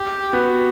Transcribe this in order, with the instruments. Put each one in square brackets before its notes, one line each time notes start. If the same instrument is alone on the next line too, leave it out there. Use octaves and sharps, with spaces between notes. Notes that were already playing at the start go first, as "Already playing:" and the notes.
Already playing: [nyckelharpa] G4
[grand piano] B3 [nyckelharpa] F#4